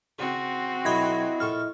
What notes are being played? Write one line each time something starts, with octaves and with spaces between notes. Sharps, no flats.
C#3 C4 F#4
B1 F#3 E4 D#5 B5 G#6 A#6
A#1 A4 C#6 F6